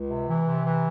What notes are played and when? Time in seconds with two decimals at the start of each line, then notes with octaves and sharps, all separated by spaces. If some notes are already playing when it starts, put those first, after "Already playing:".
Already playing: C#2
0.09 C3
0.28 E3
0.46 C3
0.64 E3